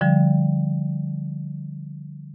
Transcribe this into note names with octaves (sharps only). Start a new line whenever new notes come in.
D3 F3 G3